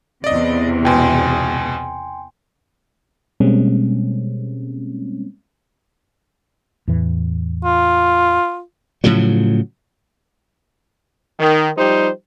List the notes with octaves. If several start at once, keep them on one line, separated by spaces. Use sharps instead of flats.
E2 C3 D5 D#5
C#2 B2 G5 G#5 C6
B2 G3 G#3 A#3 C4 C#4
E2 A2 E3
F4
A2 C#3 F3 F#3
D#3
F3 G3 D#4 G4 C5